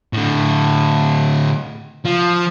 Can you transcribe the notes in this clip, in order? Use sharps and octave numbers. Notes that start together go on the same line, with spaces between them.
A2 D3
F3